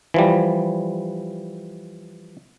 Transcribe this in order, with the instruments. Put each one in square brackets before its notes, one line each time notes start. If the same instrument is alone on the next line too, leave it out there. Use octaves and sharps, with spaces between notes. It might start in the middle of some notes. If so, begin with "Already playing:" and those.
[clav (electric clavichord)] E3 F3 G3